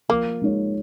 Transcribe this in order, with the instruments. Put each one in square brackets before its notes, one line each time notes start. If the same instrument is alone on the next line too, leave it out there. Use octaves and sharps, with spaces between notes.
[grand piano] F3 [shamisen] A#3
[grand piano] G#3 D#4 C#5